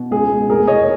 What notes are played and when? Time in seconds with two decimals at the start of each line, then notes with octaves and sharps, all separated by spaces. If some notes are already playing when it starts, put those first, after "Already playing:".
Already playing: B2
0.11 C#2 G#4
0.30 B2
0.49 F1 G#4 A#4
0.67 E2 C#5 D#5